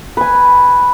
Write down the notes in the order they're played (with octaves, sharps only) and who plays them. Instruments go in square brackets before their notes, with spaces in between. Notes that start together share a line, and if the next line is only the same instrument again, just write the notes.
[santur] B4 G#5